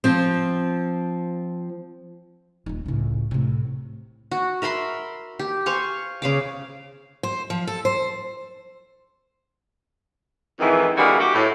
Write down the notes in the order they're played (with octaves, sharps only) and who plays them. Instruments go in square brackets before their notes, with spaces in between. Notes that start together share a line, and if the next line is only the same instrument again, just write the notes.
[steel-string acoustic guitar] F3 C4
[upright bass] D#1 D#4
C#2 A2
A2 C3
[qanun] F#4
A#4 E5 B5 C6
G4
C5 F5 G#5 C#6
C#3 F5 D6
[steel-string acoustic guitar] C5
F3
A4
C5
[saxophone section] F2 G#2 D#3 E3
D3 E3 G3 G#3 A#3 F#4
F#4 G4
A2